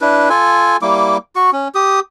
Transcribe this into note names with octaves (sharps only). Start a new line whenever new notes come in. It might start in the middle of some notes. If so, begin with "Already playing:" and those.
D4 E4 B4
F4 A4 G#5
G3 A#3 E4 D6
F#4 C#6
C#4
G4 D#6